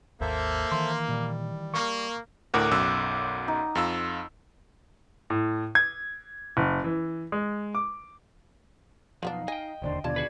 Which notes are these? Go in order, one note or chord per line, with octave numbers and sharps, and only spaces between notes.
G#1 D#2 A#3 A4 C5 E5
D#3 E3 C6
A#2 G3
A#3 C#6
D2 A2 A#4 D5 F#5
B1 F#2 E6
D#4
F2 F4 E6
A2
G#6
F#1
E3
G#3
D6
B1 F2 F3 B3 D4 D#4 F5
D#5 G5 G#5
E1 D#2 D3 C5 D5
D#2 B2 D3 G3 F4 D5 A5 G#6
F#4 G#4 B4